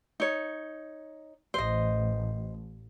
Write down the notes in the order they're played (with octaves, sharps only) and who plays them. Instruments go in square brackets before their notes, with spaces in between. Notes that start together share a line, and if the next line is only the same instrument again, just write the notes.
[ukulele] D#4 C#5
[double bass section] A1 [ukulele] C5 D#5